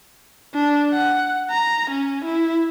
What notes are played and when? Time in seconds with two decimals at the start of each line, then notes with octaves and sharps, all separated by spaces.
0.55 D4
0.91 F#5
1.51 A#5
1.91 C#4
2.25 E4